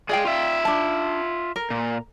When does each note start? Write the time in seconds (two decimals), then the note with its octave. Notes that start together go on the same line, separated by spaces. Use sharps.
0.09 G#3 G#4 D5 F5 G5
0.25 F4 E5
0.65 D4 A5
1.56 A#4
1.70 A#2